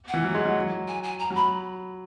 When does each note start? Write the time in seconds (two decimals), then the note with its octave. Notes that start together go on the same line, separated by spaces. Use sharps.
0.08 F#5
0.14 E3
0.24 F#3
0.34 G#3
0.45 F#3
0.87 G#5
1.03 G#5
1.19 A#5
1.30 F#3
1.35 B5